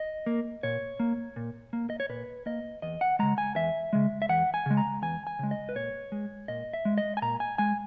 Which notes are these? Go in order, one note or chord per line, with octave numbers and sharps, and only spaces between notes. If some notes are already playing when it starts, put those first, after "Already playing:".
Already playing: D#5
A#3
A#2 C#5
A#3
A#2
A#3
D#5
C#5
A#2 B4
A#3 D#5
E2 D#5
F#5
C#3 G#3 A#5
G#5
E2 E5
C#3 G#3
E5
E2 F#5
G#5
C#3 G#3
A#5
E2 G#5
G#5
C#3 G#3
D#5
B4
A#2 C#5
G#3
A#2 D#5
E5
G#3
D#5
G#5
A#2 A#5
G#5
G#3 G#5